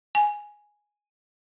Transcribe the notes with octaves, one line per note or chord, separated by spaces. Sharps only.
G#5